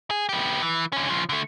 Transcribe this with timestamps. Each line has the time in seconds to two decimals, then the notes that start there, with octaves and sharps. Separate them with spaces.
0.10 G#4
0.29 B3 G4
0.62 E3
0.93 D3 C#4
1.09 C#3 F3
1.29 D3 A3